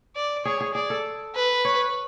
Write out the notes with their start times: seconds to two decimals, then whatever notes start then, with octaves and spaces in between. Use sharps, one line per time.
0.16 D5
0.45 G#4 C#5
0.61 G#4
0.75 G#4 D5
0.90 A4
1.35 B4
1.65 C#5